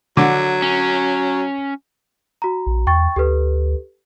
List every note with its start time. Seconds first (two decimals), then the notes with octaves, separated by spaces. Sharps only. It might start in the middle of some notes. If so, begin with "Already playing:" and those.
0.17 D3 F#3
0.62 C#4
2.42 F#4 A#5
2.66 A#1
2.87 E2 G5 C#6 A6
3.16 D2 G4 A4 B4